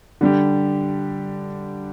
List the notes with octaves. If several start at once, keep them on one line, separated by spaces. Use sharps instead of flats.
D3 G3 D4 G4